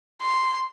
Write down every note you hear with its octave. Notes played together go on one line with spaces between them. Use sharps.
C6